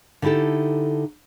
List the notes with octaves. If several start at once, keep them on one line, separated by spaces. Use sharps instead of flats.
D3 D#4 E4 G4 A4